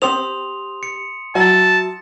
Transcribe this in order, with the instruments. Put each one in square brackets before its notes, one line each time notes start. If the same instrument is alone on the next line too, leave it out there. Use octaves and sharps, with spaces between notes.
[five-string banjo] C4 G4 C5 [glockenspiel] C6 D#6 F7
[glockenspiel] C#7
[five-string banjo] F#3 E4 F#4 [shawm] A5